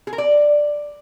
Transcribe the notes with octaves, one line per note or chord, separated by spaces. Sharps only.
G#4
A#4
D5